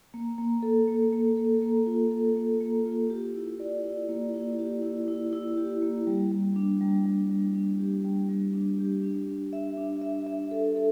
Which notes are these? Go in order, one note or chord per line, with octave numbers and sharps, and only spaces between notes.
A#3
A#3
A4
A#3
A#3
A4
A#3
F4
A4
A#3
A#3
F4
G4
E4
D5
E4
A#3
E4
G4
E4
E4
E4
G4
A#3
G3
G3
D4
G3
G3
G3
D4
G4
G3
G3
D4
G4
D4
D4
E5
D4
E5
E5
A4
A4